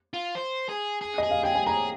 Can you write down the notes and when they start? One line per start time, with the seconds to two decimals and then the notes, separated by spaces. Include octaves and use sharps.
0.14 F4
0.35 C5
0.69 G#4
1.01 G#4
1.18 G#4 D#5
1.31 F5
1.43 G#4 G5
1.55 G#5
1.67 G#4 A#5